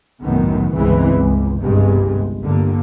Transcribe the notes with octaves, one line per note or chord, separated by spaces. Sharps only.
C2 F#2 A2 D#3 B3
G1 C#2 C#3 E3 G#3 C4
C#2
G1 C2 G2 G#3
G1 G2 D3 A#3